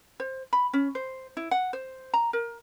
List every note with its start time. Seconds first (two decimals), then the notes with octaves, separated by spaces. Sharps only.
0.20 C5
0.53 B5
0.73 C#4
0.95 C5
1.37 E4
1.51 F#5
1.73 C5
2.14 A#5
2.33 A#4